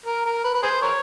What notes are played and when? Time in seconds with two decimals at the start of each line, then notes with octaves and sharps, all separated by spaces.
0.06 A#4
0.26 A#4
0.45 B4
0.55 B4
0.63 G#4 C5
0.82 A#4 C#5